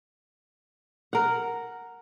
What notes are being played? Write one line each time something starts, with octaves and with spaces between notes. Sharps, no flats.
A#4 F#5